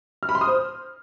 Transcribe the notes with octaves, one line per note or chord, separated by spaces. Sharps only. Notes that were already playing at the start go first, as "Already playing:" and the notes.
F6
B5
C6
D#6
C5